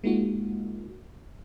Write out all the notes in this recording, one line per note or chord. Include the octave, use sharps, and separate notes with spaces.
G#3 A#3 D#4 F4 F#4